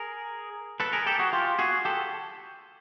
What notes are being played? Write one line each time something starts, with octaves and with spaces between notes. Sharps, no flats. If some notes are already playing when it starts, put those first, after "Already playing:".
Already playing: G#4 A#4
A4 B4
G#4 A#4
G4 A4
F#4 G#4
F4 G4
F#4 G#4
G4 A4